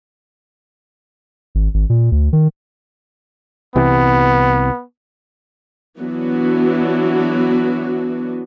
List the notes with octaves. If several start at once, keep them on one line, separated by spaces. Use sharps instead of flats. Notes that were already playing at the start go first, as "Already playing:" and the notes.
G#1
G#1
A#2
D2
D#3
C2 C3 E3 B3
E3 F#3 B3 D4 F#4